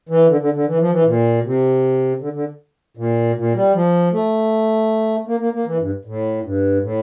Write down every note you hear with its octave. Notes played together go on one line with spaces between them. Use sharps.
E3
D3
D3
D3
E3
F3
E3
A#2
C3
D3
D3
A#2
A#2
G3
F3
A3
A#3
A#3
A#3
E3
G2
A2
G2
A2